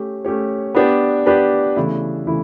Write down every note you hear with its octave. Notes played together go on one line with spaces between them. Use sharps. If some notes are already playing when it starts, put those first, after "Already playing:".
Already playing: A3 C#4 G4 C#5
A3 C#4 G4 C#5
B3 D4 G4 B4 D5
B3 D4 G4 B4 D5
C#3 E3 A3 E4
C#3 E3 A3 E4